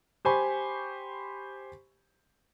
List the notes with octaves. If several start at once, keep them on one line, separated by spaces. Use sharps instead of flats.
G4 C5 G#5 B5 C#6